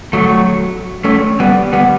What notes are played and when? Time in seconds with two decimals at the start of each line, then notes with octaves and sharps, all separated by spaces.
0.13 F#3 A3
1.04 A3 C#4
1.40 G3 B3
1.73 G3 B3